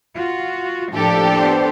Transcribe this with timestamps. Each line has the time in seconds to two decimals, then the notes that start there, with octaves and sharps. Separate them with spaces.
0.15 F4 F#4
0.93 A2 F3 A#3 D4 G4 A4
1.37 B3 C5